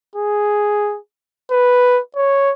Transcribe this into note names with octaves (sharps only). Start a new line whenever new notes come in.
G#4
B4
C#5